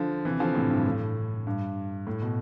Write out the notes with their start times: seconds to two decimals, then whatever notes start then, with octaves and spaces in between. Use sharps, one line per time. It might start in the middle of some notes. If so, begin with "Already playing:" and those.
Already playing: D3 F3
0.25 C3 E3
0.40 D3 F3
0.55 A2 C3
0.71 G2
0.85 A2
1.47 G2
2.07 A2
2.22 B2